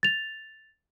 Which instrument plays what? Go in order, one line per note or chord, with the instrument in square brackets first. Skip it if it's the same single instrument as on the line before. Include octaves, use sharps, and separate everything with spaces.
[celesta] A6 F7